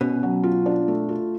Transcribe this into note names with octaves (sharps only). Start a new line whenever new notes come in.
B2 C#4
F#3
F4
D4
A3
F4